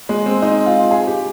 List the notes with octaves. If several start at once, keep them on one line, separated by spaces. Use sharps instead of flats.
G#3
C4
D#4
F4
G#4
G4